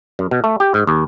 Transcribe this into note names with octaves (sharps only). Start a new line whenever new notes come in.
F#2
B2
A3
G4
G#2
D#2